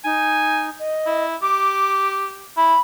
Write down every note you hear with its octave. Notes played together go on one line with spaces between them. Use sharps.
D#4 G#5
D#5
E4
G4 D6
E4 B5